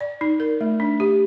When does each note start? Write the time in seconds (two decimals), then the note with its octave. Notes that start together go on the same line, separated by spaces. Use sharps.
0.01 D5
0.21 D#4
0.40 A#4
0.61 A3
0.80 D4
1.00 G4